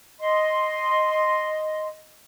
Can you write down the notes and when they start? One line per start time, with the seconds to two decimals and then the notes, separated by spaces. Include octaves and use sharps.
0.19 D#5 C6